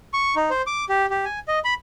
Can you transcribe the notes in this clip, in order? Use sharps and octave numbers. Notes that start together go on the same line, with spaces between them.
C#6
D#4
C5
D6
G4
G4
G#5
D#5
B5